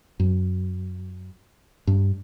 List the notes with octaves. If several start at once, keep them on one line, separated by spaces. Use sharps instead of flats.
F#2
G2